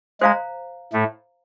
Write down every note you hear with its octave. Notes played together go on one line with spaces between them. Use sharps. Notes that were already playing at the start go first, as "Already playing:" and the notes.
G#3 C5 F5 A#5
A2 A3